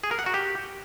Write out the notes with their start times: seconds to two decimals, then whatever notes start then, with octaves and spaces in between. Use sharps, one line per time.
0.04 G#4
0.11 A#4
0.19 F#5
0.26 F#4
0.34 G4